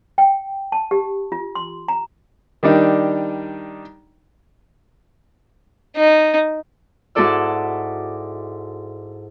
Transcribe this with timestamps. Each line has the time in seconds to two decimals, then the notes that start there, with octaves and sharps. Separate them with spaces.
0.18 G5
0.72 A5
0.91 G4
1.32 F4
1.55 C6
1.88 A#5
2.63 D#3 G3 D4 D#4
5.96 D#4
7.15 G#2 E4 F#4 A4 D5 E6